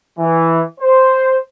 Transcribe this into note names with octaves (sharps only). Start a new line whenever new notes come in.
E3
C5